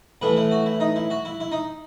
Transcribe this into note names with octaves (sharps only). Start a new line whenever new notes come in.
A2 E3 A3 B4
E4
F#4
E4
D#4
E4
F#4
E4
E4
D#4